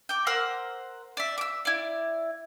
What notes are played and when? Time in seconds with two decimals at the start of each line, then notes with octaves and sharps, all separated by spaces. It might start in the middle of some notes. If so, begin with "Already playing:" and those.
0.09 G5 D6
0.26 A#4 C5 F#5 E6
1.17 D5 E5
1.38 D6 E6
1.65 E4 D5